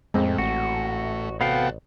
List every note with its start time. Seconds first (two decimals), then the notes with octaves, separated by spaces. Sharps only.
0.14 F2 A2 G#3 C4
0.38 A1 F#4
1.41 C3 B3 F#4 A4 F5 G5